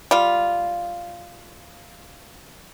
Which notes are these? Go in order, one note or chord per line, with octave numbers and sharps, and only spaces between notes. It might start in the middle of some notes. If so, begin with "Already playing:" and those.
G3 F4